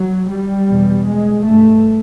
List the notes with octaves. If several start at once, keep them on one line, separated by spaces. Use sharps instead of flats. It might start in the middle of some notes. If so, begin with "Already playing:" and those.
Already playing: F#3
G3
E2 B2
G#3
G2 A3